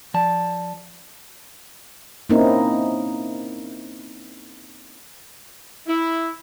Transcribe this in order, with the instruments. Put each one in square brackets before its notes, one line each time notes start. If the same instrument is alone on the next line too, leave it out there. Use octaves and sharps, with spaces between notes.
[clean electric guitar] F3 D5 A5
[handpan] A#3 C4 C#4 D#4 E4 A#4
[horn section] E4